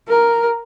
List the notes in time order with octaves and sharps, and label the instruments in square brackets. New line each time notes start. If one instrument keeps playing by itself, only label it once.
[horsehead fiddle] A#4